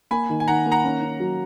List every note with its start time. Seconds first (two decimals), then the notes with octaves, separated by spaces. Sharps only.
0.11 A#3 G#5 B5
0.29 D#3
0.40 G#5
0.48 D#3 F#5 A#5
0.66 A#3
0.71 F#5 A#5
0.84 C#4
1.02 C#4
1.20 F#3